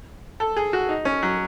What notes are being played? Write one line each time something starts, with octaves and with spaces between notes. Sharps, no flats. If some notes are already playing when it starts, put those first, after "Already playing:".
A4
G#4
F#4
D#4
C#4
F#3